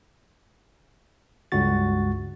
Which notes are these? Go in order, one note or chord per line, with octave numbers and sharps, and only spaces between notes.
C#2 G2 F#4 A6